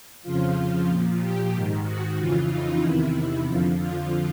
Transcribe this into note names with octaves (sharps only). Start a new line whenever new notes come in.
F2 C#3 F3 F4
A#2 F3
G4
G#2 D#3
F#4
F2 C#3 E3 F4
D#4
E2 C3 D#3 E4
F2 D3 F3 F4
F4